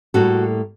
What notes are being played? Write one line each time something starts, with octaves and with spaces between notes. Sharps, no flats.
A2 G3 A#3 F#4 A4